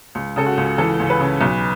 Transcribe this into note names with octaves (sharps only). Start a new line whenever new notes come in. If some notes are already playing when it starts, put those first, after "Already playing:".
C#2
C#3 A4
F#4
C#2
E3 A4
C#2
B4
C#3
B1